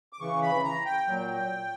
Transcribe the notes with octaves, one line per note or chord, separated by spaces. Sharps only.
D6
C#3 E3 C#6
B5
A#5
G5
A#2 F#3